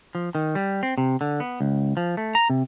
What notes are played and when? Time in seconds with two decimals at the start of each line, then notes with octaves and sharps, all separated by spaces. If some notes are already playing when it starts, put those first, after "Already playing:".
0.15 F3
0.35 D#3
0.55 G3
0.83 C4
0.98 C3
1.21 D3
1.40 B3
1.61 C#2
1.97 F3
2.17 A3
2.35 A#5
2.50 C3